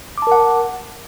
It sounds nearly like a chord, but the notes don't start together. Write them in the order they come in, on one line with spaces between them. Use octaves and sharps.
D6 A5 A#4 F#5